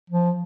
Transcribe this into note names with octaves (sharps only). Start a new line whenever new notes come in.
F3